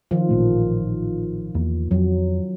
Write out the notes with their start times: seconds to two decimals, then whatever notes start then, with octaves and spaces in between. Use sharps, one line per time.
0.11 D#3 F3 F4
0.29 A1 A#2 A3
1.55 E2 A#3
1.91 F2 F#3